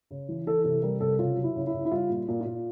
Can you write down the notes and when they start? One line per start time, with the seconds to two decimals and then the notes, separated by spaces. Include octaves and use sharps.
0.11 C#3
0.29 E3
0.47 E3 A4
0.64 C3 A4
0.82 G3 A#4
1.01 C3 A4
1.19 C#3 F4
1.37 F#3
1.44 E4
1.56 C#3
1.67 E4
1.74 C#3
1.85 E4
1.91 G3 F4
2.09 A#2
2.28 A#2
2.41 F4
2.46 A#2